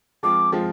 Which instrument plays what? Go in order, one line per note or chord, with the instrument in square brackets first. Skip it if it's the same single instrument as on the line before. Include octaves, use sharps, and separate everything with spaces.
[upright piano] F3 G#3 C4 F4 [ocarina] D6
[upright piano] F3 G#3 C4 F4